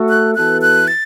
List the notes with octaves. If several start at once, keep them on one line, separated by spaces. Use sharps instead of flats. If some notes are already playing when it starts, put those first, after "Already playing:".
Already playing: A3 F#4 A4
F#6
E3 B3 F#4 A4 F#6
F#6
A6